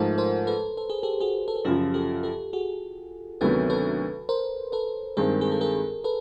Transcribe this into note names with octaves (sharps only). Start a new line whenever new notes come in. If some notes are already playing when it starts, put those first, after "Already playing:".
Already playing: G#2 F3 A3 A#4 C5
A#4 C5
A4 B4
A4
G#4
G4 A4
F#4 G#4
A4
G#4
F#2 C#3 F3 F4 G4
G4 A4
G4 A4
F#4 G#4
D2 C3 D#3 F#3 B3 A4 B4
A4 B4
A#4 C5
A4 B4
G2 D#3 G#3 C4 G#4 A#4
G#4
A4
G#4 A#4
A4 B4